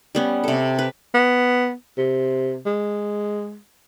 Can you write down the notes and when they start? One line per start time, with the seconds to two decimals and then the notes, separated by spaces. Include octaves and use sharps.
0.15 G3 B3 C#4
0.44 C3 A4
0.79 B4
1.14 B3
1.97 C3
2.66 G#3